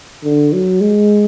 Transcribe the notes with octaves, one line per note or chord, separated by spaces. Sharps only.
D3
F#3
G#3